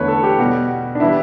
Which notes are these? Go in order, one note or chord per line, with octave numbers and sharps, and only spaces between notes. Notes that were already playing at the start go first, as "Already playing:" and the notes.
Already playing: E2 D3 A3 B4 C#5
A4
G4
B2 G3 F#4
D4
E3 G3 E4